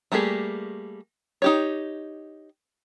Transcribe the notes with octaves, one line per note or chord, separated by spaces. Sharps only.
G3 A3 A#3 G4 G#4
D#4 G4 C#5